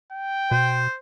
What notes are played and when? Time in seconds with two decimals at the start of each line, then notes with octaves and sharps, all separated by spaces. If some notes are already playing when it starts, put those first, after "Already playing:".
0.13 G5
0.51 B2 C5